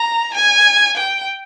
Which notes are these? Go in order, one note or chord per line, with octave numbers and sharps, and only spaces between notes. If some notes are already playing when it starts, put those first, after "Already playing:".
Already playing: A#5
G#5
G5